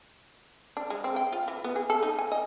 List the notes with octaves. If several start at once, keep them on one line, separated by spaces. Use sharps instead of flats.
D4
G#3
C4
G5
F4
E3
B3
G#4
A4
D#4
G#5
D#5